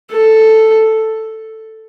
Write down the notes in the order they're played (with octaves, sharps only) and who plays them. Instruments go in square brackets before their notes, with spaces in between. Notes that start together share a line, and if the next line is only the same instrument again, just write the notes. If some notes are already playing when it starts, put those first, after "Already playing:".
[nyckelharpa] A4